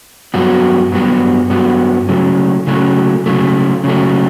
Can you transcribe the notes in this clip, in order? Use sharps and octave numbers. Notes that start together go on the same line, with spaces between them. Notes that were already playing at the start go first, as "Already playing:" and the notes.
G2 F#3 B3 F#4
G2 F#3 B3 F#4
G2 F#3 B3 F#4
C#3 F#3 A3
C#3 F#3 A3
C#3 F#3 A3
C#3 F#3 A3